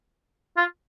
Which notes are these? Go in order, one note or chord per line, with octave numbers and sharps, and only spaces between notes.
F4